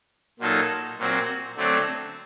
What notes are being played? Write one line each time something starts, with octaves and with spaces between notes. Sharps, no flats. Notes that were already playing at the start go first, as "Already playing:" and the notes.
A#2 F#3 A#3 D#4 A4
A#2 F#3 C4 F#4
D3 F#3 A3 C4